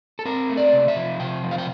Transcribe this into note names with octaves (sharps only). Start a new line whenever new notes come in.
A4
C4 A#4
A3
D5
C3
E5
F3
C3 G5
F3
F5
G5